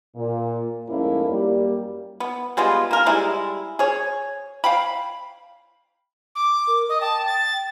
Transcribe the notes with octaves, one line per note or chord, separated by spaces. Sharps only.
A#2
F2 G#2 A3 A#3 C#4 E4
F#2 G3 A#3
B3
G3 G#3 B3 F4
A#3 A#4
G3 G#3 E4
G#4 C#5
F5 G5 B5
D6
A#4
D#5 D#6
G5 A5
A6